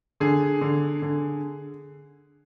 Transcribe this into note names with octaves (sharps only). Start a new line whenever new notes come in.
D3 G#4
D3
D3